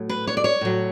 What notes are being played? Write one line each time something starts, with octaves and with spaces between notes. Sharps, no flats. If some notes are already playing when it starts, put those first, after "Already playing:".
Already playing: A2 F#3
B4
C#5
D5
C#5
A2 F#3